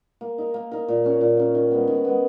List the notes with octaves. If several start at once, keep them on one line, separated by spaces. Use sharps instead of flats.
A#3
D#4 A#4
A#3
D#4 A#4
A#2
A#3 C#4
A#2
A#3 C#4
D#3
G#3 B3
D#3
G#3 B3